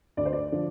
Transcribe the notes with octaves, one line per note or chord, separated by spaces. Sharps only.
D2 D5
C5
D5
D3 F3